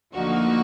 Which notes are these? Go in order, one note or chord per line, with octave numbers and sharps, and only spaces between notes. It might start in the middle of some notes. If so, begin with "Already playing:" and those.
D2 D3 F3 A#3 D#4 F#4